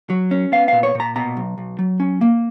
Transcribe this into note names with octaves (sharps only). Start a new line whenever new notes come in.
F#3
C#4
B3 F5
A#2 F5
C#5
A#2 A#5
B2 A#5
B1
B1
F#3
C#4
A#3